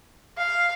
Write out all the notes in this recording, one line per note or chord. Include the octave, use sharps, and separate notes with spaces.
F5